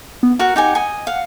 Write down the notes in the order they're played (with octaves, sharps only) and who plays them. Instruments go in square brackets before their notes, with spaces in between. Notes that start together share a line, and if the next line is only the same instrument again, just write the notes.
[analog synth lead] B3
[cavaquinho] F#4 A#4 [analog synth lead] F#5
[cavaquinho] D#4 G4 G#5
D#5 G#5
[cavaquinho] F5 [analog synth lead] F#5